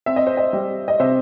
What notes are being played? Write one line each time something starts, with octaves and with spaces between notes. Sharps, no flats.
C4 E5
D#5
C5
D#5
G3
D#5
C3 C5 E5